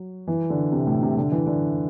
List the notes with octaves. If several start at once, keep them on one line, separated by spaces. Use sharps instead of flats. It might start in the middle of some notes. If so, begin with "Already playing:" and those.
Already playing: F#3
E3
D3
C3
A2
C3
D3
E3
D3